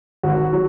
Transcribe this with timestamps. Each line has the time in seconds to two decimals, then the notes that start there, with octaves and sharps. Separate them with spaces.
0.23 G#1 F#4
0.53 F#3